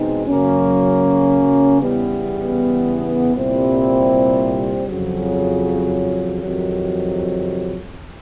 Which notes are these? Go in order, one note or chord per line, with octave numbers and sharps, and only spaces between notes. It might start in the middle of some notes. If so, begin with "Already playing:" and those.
Already playing: E2 B2 G#3 C4 D#4
F#2 C#3 F#3 A#3 C#4
E2 C#3 E3 G3 B3
C2 A#2 G3 C4 E4
F2 C#3 F#3
F2 C3 D#3 F#3